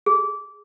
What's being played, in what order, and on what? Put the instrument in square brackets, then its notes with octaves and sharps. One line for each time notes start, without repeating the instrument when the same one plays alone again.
[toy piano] G#4